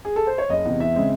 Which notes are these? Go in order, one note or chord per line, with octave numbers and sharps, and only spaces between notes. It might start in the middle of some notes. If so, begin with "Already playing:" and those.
G#4
A4
C5
C#5
F#1 D#5
E2 C3
E2 E5
C#3 G#3 C4